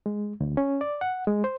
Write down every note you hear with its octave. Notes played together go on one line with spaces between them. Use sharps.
G#3
D2
C#4
D5
F#5
G#3
C5